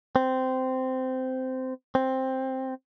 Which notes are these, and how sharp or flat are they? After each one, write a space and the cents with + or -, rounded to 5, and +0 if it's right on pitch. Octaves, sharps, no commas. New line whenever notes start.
C4 -15
C4 +5